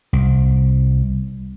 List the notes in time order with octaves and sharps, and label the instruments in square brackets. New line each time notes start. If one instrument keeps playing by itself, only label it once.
[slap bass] C2